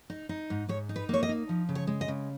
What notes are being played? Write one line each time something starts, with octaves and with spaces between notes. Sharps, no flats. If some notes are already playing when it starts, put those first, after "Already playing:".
D#4
D#4
G#2
G#2 C#5
D#4
B4
A#3 C#5
D#5
D#4
F3
C#3
C#5
G#3
D#5
C#3